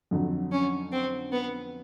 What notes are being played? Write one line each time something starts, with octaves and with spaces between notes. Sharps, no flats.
F2 D3 F#3
C#4
C4
B3